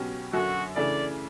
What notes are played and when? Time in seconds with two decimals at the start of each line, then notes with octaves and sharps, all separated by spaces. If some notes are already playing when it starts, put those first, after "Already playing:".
Already playing: B2 F#3 C#4 G4
0.33 F#2 D3 F#3 F#4
0.75 C#3 E3 A3 D4 D5